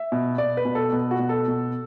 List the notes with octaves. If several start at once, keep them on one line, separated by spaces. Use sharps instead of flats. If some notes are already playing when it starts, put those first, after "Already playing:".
Already playing: E5
B2
B2 D5
B4
B2
A4
B2
F#4
B2
A4
B2